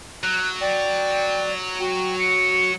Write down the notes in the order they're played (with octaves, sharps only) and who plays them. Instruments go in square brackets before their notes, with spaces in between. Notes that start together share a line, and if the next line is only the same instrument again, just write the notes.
[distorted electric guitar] F#3 [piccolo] F#6
[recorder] D5 [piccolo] G5
[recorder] F#4 [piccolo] G5
[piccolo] C#7